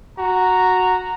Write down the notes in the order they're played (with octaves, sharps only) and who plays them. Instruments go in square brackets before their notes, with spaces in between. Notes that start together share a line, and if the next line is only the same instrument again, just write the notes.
[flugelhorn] F#4 [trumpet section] A#5